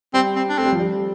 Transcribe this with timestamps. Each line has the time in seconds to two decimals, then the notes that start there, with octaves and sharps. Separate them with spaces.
0.14 G3 C4
0.36 C4
0.49 D4
0.58 A3 C4
0.65 G3
0.72 F3
0.79 G3